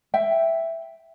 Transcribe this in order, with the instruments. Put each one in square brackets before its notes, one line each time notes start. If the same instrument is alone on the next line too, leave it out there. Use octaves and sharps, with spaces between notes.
[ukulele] E5 G5